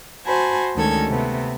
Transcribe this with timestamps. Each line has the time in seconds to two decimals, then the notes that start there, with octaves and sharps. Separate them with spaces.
0.25 F#4 C5 G#5 A5 B5
0.75 D2 D#3 G#3 C#4 A4 G#6
1.08 C3 A3 B3